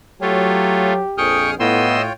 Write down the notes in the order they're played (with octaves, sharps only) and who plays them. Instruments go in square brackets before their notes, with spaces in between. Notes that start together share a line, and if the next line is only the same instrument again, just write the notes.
[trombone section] F#3 [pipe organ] A3 F4 [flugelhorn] G4 [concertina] C#5
[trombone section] A#1 F2 [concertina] G#4 D#6 F6 [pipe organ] G5 C#6
[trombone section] A2 [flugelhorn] B3 [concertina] F4 C#5 G5 [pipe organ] D#5 C6 E6